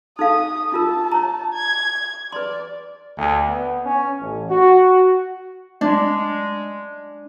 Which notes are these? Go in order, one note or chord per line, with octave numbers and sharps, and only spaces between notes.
D#4 A4 F5 D#6
D4 F4 A#4 A5
C#5 A#5
G#6
B4 D5 C6
D2
B3
C#4
A1
F#4
G#3 D4